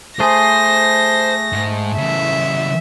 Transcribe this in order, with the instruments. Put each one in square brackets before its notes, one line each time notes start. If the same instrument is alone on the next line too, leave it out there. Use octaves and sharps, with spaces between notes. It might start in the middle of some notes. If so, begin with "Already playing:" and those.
[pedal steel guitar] A3 G#4 [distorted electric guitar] C5 [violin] A#6
[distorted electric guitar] G#2
[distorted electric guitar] C#3 E3 [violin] E5